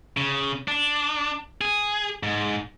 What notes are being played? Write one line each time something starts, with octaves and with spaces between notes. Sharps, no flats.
C#3
D4
G#4
G#2